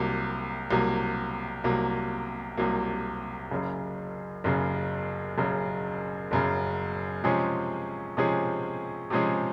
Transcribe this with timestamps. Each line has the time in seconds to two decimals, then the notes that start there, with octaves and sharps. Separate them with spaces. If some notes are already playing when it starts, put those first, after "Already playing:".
Already playing: C2 C3 F#3 A#3
0.71 C2 C3 F#3 A#3
1.64 C2 C3 F#3 A#3
2.57 C2 C3 F#3 A#3
3.51 F#1 F#2 C#3
4.44 F#1 F#2 C#3
5.38 F#1 F#2 C#3
6.31 F#1 F#2 C#3
7.24 C3 F3 G#3 C#4 G#4
8.17 C3 F3 G#3 C#4 G#4
9.10 C3 F3 G#3 C#4 G#4